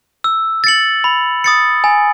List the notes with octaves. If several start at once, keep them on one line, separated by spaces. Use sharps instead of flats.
E6
A6 C#7 F#7
B5
D#6 A6 C#7
G#5